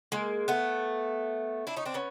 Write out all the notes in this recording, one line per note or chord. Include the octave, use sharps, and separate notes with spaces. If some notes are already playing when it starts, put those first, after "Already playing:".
G#3 A#3
A3 B3
D4 E4
C#4 D#4
C4 D4
B3 C#4